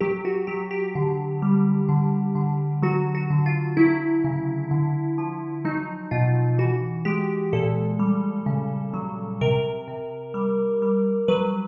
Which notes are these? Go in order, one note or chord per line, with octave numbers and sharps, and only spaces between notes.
F#3 G4
F#4
F#3 G4
G4
D3
G3
D3
D3
F#3 F#4
F#4
D3
F4
F#3 E4
C#3
D3
F3
F#3 D#4
B2 F4
E3 F#4
G#3 G4
A#2 A4
G3
C#3
F#3
C3 A#4
C3
G3
G3
F#3 B4